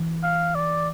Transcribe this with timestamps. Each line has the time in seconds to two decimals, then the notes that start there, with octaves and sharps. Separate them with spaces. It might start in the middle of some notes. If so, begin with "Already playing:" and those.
Already playing: E3
0.23 F5
0.55 D5